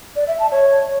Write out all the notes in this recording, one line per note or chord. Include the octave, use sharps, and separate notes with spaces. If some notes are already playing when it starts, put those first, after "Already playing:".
D5
E5
A5
C#5